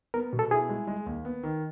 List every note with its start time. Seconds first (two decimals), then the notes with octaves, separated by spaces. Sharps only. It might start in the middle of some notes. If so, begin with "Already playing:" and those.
0.14 B3 A#4
0.33 B2
0.39 A4
0.51 E4 G#4
0.69 G#3
0.87 G#3
1.06 D#2
1.25 B3
1.43 D#3